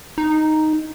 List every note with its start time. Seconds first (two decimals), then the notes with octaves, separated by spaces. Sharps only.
0.18 D#4